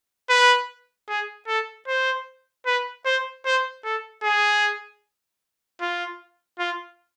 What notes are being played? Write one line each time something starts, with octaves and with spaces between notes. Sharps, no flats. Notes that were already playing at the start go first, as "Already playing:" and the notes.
B4
G#4
A4
C5
B4
C5
C5
A4
G#4
F4
F4